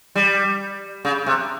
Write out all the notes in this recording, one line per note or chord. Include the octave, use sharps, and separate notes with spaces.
G3
C#3
C3